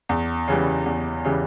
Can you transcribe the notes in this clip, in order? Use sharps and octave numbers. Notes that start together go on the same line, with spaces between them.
E2
C#3 E3 G3
E2
C#3 E3 G3